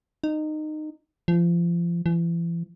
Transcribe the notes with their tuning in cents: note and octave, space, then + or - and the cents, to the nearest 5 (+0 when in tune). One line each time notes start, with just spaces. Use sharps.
D#4 -20
F3 -30
E3 +40